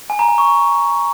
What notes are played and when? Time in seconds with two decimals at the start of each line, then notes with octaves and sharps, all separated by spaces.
0.10 G#5
0.19 A#5
0.29 G#5
0.38 C#6